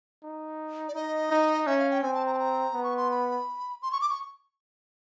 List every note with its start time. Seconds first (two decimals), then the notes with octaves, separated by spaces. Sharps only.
0.23 D#4
0.88 D5
0.94 D#4 D#5
1.31 D#4
1.67 C#4 E5
1.79 F5
1.91 G5
2.02 C4 G#5
2.14 A5
2.26 A#5
2.34 A5
2.39 A#5
2.74 B3
2.83 C#6
2.97 C6
3.11 B5
3.82 C6
3.92 C#6
4.01 D6
4.09 C#6